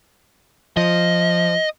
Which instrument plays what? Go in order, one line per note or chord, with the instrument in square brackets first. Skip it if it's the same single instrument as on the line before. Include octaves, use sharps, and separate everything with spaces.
[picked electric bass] F3 [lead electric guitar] D#5